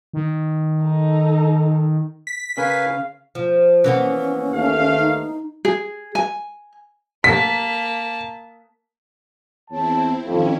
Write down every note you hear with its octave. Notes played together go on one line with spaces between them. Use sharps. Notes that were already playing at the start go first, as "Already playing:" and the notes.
D#3
D#4 A4
B6
C#3 A#4 B4 F5 G#5
F3
E3 A#3 B3 C#4
D#2 A3 F5
D#4
G#4
G#5
A#3 A5 B6
E2 C4 E4 C#5 A5
A1 F2 D#3 C#4 E4